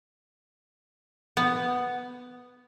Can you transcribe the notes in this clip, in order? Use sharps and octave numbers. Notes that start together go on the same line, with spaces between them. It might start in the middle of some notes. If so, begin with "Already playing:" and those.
B3